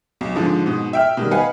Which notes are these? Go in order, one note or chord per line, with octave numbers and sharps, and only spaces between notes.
B1
G#2 D3 F3 G#3
G#2 B2
E5 G5 F6
B2 D#3 G3
B4 D#5 F5 F#5 G#5